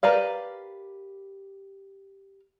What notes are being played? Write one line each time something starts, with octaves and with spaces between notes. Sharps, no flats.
G4 A#4 B4 D5 F5